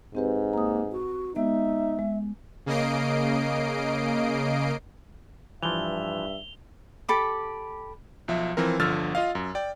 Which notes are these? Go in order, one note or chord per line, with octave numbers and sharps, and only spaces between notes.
G#2 C4 G4 B4
A#3 A#5 D#6
F#4
G#3 B3 D#4 G4 E5
G#3
C#3 A#3 D#5 C7 D7
G2 E3 F3 E5 F7 G7
G4 A4 B5 D6
B1 F3 E5
E3 F3 C4 A#4
G1 D3 F3 E6 F6 A6
F4 D#5 F5
F#2
D5 G5